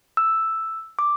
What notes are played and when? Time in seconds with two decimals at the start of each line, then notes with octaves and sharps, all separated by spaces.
0.17 E6
0.99 D6